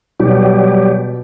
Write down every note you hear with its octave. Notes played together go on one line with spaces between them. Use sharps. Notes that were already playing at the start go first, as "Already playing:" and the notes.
B2 F#3 G3 G4